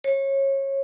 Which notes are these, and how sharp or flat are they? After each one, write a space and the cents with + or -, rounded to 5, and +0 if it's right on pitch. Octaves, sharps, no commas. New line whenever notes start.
C#5 -25